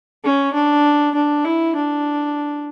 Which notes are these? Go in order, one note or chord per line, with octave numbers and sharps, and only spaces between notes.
C#4
D4
D4
E4
D4